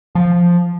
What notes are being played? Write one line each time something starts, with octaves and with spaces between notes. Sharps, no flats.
F3